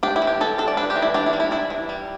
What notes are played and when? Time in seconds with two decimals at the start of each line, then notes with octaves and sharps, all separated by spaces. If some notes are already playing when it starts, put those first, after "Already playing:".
0.03 D4 G4
0.16 E4
0.22 E3
0.27 G4
0.41 G3 A4
0.58 D4 A4
0.68 D5
0.77 D4 B4
0.90 G4
0.96 E3
1.02 E4
1.14 D4 G4
1.26 E4
1.33 G3
1.40 E4
1.51 D4 E4
1.70 E3
1.89 G3